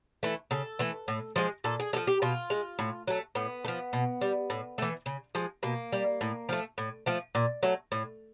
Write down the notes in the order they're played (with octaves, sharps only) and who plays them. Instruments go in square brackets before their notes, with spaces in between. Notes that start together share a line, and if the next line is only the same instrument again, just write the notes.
[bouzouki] E3 A3
C#3 A4
E3 A3
A2
F3 G#3
A#2 A4
G#4
F3 G#3 A4
G4
B2 F4
G#3
A2
F#3 A3
A2 B3
A3
F3
B2
G3
A2
E3 A3
C#3
F3 G#3
B2 A#3
G3
A2
F3 A3
A2
F3 A3
A#2
F#3 A3
A2